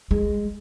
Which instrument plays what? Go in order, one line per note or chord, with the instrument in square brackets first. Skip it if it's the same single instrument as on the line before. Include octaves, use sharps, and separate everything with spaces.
[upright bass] G#3